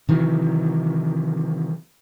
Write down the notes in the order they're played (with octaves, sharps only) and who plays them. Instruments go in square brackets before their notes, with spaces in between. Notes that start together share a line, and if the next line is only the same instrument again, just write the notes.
[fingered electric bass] C3 D#3 E3 F#3